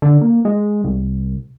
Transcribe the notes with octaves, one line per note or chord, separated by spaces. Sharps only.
D3
A#3
G#3
C2